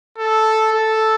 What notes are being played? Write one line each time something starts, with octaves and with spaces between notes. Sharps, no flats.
A4
A4